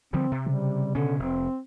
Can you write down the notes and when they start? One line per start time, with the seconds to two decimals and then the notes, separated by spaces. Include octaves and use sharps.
0.13 D3 F3 G3 C4
0.32 C3
0.46 C#3 G3
0.95 B2 D3 C#4
1.19 F1 C4